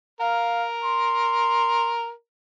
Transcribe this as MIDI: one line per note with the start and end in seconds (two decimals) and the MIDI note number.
0.21 2.10 70
0.21 0.67 77
0.84 1.93 84